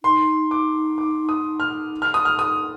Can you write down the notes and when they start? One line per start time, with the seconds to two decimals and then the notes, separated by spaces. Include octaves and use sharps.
0.03 D#4 C6
0.51 D6
0.98 D6
1.29 D#6
1.60 F6
2.02 F6
2.14 D#6
2.25 F6
2.39 D#6